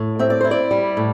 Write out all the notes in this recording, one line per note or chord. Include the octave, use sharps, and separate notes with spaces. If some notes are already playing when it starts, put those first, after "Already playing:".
Already playing: A2
C4 E5
D5
E4 C5
D5
G3
A2